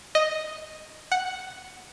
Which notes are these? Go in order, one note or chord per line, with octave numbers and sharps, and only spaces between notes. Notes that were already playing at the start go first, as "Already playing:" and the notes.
D#5
F#5